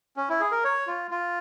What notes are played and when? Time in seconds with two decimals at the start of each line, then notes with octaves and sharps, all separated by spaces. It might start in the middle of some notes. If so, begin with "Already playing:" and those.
0.17 C#4
0.29 E4
0.40 G#4
0.52 A#4
0.64 C#5
0.87 F4
1.11 F4